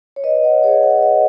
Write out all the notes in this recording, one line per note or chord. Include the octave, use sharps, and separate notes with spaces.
C#5
B4 D#5
C#5 F#5
G#4 C#5
C#5 F#5
B4 D#5